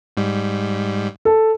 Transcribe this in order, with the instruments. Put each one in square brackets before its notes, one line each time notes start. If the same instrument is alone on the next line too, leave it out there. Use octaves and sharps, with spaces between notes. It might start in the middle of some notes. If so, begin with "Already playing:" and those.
[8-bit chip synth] G#2 G3
[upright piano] A4